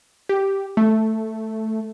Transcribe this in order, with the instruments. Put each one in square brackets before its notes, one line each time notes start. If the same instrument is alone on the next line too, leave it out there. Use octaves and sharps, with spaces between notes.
[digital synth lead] G4
A3